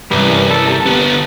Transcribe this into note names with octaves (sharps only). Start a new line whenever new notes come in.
C2 G2 E3 G3 C#4
A4
G4 A#4 A5
D3 B3